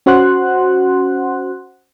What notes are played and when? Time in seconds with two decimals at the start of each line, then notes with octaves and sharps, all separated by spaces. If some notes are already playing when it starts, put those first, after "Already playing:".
0.06 C#4 F#4 C5 F#5 C6 F#6